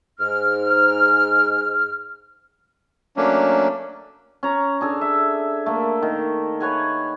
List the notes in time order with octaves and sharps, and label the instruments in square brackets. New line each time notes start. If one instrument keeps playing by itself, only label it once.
[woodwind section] G#2 F6
[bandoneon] F#3 A3 A#3 C#4 D4
[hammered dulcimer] C#4 A#5
D4 G#4 A4
E5
A3 A#3
D#3
B4 C#5 F#5 G#5